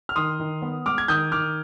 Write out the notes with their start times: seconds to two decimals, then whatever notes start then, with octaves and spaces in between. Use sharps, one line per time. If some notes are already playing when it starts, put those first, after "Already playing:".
0.09 F6
0.16 D#3 C6 D#6
0.39 D#3
0.62 B3
0.86 G#3 D6 F6
0.98 G#6
1.08 D#3 D#6 G6
1.32 D#3 D6 F6